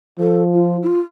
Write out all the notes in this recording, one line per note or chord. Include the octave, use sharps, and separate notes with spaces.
F3 A4
F4
E4
F4